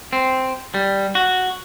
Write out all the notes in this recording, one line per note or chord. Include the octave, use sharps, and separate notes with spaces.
C4
G3
F#4